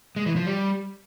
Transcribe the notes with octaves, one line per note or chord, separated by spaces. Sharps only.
G#3
E3
F3
G3